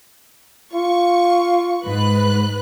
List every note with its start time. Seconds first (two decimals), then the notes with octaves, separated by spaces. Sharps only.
0.73 F4 C#6
1.85 G#2 B4 F#6